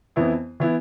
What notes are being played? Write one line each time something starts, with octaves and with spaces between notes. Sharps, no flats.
F2 E3 B3 E4
E3 B3 E4